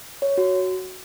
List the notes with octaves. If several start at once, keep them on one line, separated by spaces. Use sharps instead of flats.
C#5
F#4